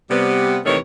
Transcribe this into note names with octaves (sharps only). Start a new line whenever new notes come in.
C3 G3 B3
D#2 C3 D#3 E3 A3 C#5